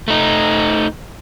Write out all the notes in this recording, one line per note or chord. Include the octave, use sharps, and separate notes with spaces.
A3 D#4